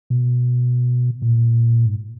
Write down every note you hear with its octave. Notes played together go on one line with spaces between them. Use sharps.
B2
A#2
G#2